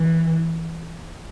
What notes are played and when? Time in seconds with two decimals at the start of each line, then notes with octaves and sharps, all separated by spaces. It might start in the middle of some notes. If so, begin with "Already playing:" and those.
Already playing: E3